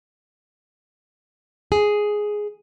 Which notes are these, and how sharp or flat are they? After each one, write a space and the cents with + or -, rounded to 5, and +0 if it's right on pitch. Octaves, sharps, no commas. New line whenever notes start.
G#4 +5